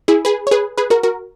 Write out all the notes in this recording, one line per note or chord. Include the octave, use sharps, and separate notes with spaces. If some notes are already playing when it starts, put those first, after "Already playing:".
E4 G#4
G#4 B4
C#5
G#4 B4
G#4 B4
F#4 A#4
F#4 A#4